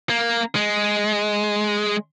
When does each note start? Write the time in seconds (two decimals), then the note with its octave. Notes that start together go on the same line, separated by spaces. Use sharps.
0.10 A#3
0.55 G#3